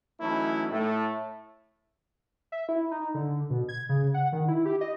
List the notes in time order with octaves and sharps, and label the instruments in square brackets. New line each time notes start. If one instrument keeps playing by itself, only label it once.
[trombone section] E3 F#3 A3 C#4 D#4 E4
A2 A3
[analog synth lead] E5
E4
D#4
D3
B2
G#6
C#3
F#5
D#3
E4
G4
D#5